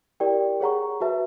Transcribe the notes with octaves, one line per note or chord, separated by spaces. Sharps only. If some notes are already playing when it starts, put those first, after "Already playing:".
E4 G4 A#4 D5 G5
G#4 C#5 F#5 A#5 C#6
F#4 B4 E5 A5